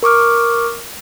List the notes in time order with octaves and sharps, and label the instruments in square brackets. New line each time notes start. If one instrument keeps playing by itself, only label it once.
[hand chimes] A#4 C#6 D6 F6